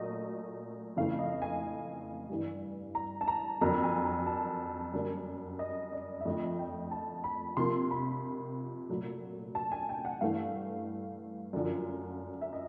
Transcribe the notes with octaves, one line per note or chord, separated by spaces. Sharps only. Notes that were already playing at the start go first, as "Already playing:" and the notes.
Already playing: A#2 F#3 A3 D#5
F2 C#3 E3 A3 F5
D#5
G#5
G2 E3 G3
A#5
A5
A#5
F2 D3 F#3 A#3 A#5
G#5
A#5
A5
F#2 D3 G3 A#3
D#5
D5
E5
F2 D3 F3 A3 D#5
G5
A5
B5
C3 F3 A#3 C6
B5
A#2 F#3 A3
A5
G#5
G5
F#5
G2 E3 A3 F5
F#2 D3 F3
E5
D#5